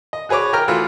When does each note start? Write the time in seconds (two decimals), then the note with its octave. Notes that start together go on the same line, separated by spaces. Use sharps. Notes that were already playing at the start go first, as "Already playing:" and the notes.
0.13 D#5
0.29 F#4 G#4 B4 C#5 D6
0.53 A#4 G5 A#5 F6
0.68 E3 A3 F4 F#4